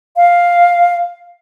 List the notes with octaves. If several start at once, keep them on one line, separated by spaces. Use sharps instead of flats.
F5